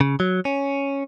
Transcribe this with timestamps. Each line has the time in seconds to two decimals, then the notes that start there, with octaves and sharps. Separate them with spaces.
0.01 C#3
0.20 F#3
0.45 C#4